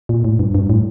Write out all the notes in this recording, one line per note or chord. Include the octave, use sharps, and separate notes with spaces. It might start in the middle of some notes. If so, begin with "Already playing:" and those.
A#2
A2
G2
G2
A2